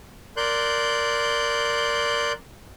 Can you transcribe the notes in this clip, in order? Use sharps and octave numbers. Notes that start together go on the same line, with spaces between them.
A#4 D5 C6 F#6 G6